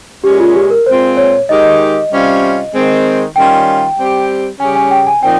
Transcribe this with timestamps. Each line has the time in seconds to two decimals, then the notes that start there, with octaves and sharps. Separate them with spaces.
0.24 A#2 G#3 C#4 G4
0.40 F4
0.55 G4
0.70 A#4
0.86 A#2 G#3 C4 F4 C5
1.17 C#5
1.49 D#3 G#3 D#4 G4 D#5
2.11 C3 G3 C#4 F4
2.73 D#3 G#3 C4
3.36 D#3 G3 C#4 F4 G5
3.98 G3 C4 G4
4.60 C#3 G3 C#4 G4 G#5
4.75 G#5
4.91 G5
5.07 G#5
5.23 A#2 F3 C4 D#4 G5